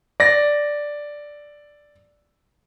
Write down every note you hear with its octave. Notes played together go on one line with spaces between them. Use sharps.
D5 A#6